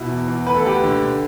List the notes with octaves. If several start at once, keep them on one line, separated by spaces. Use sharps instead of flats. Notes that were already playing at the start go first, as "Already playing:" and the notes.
Already playing: B2 E4
E2
E2
D2 B4
A4
D2 G4 B4
D3
D3